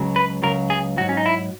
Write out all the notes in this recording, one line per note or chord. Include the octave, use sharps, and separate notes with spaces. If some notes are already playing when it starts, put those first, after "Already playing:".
Already playing: C#2 C#3 F#3
B4
C#2 C#3 F#3 A#4
G#4
G#2 F#3 F#4
C#4
D#4
E4